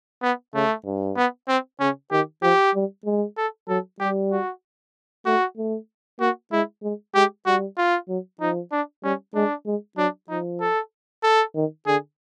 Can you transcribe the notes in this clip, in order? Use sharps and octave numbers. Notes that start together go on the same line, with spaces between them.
B3
C#3 A3
G2
B3
C4
C#3 C#4
D#3 G4
F3 G4
G3
G#3
A4
F#3 A4
G3 G4
F#4
A3 F#4
A3
A#3 F#4
G#3 E4
G#3
G#3 G4
G3 F#4
F4
F#3
F3 D#4
D4
G3 C#4
G#3 D4
G#3
F#3 D4
F3 D#4
A4
A4
D#3
D3 G#4